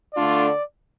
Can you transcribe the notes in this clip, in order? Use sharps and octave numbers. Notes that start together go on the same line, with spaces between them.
D3 A3 D4 F4 D5